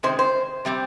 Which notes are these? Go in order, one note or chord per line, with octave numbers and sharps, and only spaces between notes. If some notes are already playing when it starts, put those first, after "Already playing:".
C3 D#3 G#3 C5
C5
C3 G3 C4